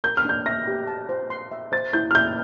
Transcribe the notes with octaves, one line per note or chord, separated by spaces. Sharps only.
A#4 G6
F6
D4 G6
E5 A#6
G4
A5
C5
C6
E5
C5 A6
E4 G6
F6
E5 G6